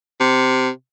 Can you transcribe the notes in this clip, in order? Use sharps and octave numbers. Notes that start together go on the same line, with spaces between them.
C3